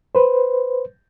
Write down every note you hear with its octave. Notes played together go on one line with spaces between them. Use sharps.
B4 C5